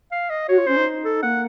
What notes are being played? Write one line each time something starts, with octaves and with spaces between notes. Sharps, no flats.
F5
D#5
F#4 C#5
F4
C#4 C5
D#4
A4
A#3 F#5